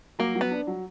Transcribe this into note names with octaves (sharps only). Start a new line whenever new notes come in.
F#3 A#3
F#3
B3
D4
F#3